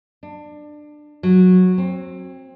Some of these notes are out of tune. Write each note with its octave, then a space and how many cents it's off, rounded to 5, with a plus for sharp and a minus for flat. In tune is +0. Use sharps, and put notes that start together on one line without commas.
D4 +20
F#3 -10
C4 +20